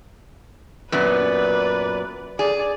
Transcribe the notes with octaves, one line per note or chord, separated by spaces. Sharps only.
F#2 A#2 B3 B4 D5
G#4 D5